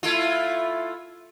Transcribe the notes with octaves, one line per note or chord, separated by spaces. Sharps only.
A3 E4 F4